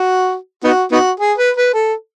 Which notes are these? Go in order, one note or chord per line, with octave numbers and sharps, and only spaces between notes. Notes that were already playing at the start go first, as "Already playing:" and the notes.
Already playing: F#4
B3 D#4 F#4
B3 D#4 F#4
G#4
B4
B4
A4